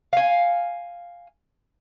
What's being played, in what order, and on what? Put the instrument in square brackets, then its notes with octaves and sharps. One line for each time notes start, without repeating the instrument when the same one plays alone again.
[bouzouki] F5 G#5